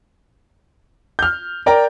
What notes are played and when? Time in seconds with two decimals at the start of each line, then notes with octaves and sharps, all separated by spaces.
1.19 F6 G6
1.66 A#4 D5 G5 A#5